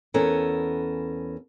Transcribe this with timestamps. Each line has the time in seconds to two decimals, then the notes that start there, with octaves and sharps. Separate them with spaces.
0.14 E2 B3 C#4 A4 A#4